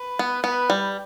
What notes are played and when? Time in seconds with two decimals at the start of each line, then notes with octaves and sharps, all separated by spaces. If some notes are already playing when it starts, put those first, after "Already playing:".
Already playing: B4
0.19 B3
0.44 B3 B4
0.70 G3